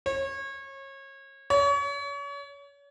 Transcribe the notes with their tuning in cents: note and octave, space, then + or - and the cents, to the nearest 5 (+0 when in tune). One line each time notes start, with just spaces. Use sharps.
C#5 -30
C#5 +35